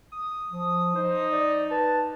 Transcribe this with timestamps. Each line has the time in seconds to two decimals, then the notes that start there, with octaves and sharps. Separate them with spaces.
0.12 D#6
0.51 F3
0.95 D#4 C5
1.32 D5
1.71 B4 A5